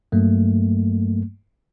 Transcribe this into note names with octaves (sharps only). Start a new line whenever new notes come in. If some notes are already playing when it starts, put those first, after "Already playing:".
G2 F#3 A3 A#3